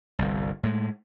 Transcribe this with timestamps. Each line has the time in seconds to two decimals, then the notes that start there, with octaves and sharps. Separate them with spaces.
0.19 G1 C2
0.63 A2 G#3